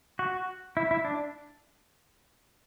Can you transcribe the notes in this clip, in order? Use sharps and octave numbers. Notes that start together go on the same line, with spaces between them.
F#4
E4
E4
D4